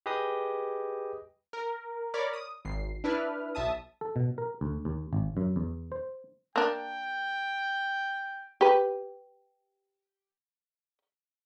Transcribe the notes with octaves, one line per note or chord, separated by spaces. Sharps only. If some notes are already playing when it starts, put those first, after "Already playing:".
G4 G#4 B4 D#5 D#6
A#4
A#4 C#5 D5 B5 D6 F6
D#6
G#1 C7
D4 E4 B4 F6
B1 E5 A5 D#6
A4
B2
A#4
D2
D#2
G#1
F#2
E2
C5
A#3 D4 G5
G4 B4